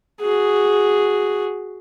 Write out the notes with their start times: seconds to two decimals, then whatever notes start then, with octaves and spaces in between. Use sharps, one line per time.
0.21 F#4 G#4